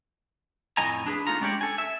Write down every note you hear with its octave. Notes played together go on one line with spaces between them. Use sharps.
F2 A2 D#5 G#5 A#5
D4 G#4 B4
A3 B3 D#4 F4 A#5
G#3 C#4 D4 G4 C#5 D5
A4 G#5
E5